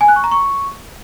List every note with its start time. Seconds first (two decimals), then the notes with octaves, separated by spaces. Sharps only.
0.01 G#5
0.08 F#6
0.16 C#6
0.24 A#5
0.32 C#6